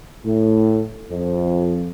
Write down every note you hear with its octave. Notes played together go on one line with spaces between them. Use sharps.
A2
F2